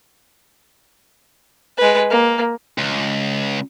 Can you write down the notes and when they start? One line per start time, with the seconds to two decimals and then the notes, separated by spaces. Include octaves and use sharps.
1.77 G#3 B4
2.10 A#3
2.78 C#2